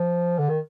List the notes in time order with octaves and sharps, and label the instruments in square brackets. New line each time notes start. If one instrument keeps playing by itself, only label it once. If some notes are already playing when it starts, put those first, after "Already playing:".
Already playing: [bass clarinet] F3
D3
D#3